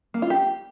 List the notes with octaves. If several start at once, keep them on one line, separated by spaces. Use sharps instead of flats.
A#3
F4
G4